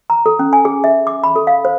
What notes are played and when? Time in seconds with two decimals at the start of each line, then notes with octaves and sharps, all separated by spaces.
0.10 A#5
0.26 A4
0.39 C#4
0.53 G#5
0.65 G#4
0.84 E5
1.07 D6
1.24 B5
1.36 A4
1.47 F5
1.65 C5